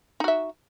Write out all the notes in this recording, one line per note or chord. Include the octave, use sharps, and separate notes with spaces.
D#4 F#4 E5